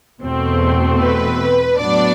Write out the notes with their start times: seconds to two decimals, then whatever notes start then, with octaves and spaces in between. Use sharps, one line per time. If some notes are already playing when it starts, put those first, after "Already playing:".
0.21 E2 B2 A3 C4
1.00 B4
1.78 A2 F#3 B3 D4 D5